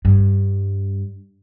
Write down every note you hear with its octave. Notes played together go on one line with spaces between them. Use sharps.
G2